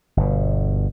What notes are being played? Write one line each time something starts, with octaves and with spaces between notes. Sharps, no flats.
G1 B2